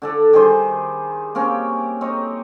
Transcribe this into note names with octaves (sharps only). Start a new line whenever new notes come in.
D3 D4 A4
D#3 G3 G#4 C5
A#3 C4 C#4 G4
C4 D#4 C#5